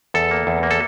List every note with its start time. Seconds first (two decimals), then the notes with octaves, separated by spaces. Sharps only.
0.14 E2 A4
0.31 A#3
0.47 E2
0.63 A#3
0.71 A4